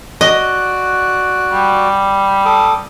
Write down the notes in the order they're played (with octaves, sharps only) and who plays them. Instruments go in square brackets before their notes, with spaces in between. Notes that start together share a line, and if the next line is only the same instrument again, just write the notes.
[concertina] F#4 D5 F#6 [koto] D#5
[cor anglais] G3
[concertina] A4 D6 D#6